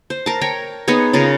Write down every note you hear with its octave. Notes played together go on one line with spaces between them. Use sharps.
C5
A#4 A5
A#4 C#5 G5
B3 D#4 G#4 C#5
C#3 F4 G#4 A#4